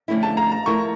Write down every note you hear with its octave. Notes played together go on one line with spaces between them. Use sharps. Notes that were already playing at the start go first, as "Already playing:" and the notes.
F2 D3 A3 C#4 E4
A5
A#5
A#5
F3 A3 E4 A#4 C#6